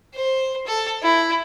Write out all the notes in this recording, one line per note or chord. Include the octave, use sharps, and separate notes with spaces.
C5
A4
E4